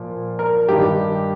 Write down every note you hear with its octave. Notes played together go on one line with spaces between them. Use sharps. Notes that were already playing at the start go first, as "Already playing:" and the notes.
Already playing: A#2 F3
A#4
G2 D#3 G4